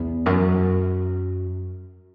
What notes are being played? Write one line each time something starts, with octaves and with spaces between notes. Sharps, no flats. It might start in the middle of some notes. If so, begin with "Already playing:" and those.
Already playing: E2
F#2